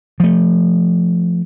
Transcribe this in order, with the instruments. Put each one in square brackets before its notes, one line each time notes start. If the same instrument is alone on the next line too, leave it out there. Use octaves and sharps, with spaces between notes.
[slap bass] F3 A3